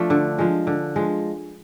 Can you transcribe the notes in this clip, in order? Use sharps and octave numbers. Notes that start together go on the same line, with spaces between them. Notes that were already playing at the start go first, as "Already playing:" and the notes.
Already playing: F3 A3 D4
D3
F3 G#3
D3
F3 G#3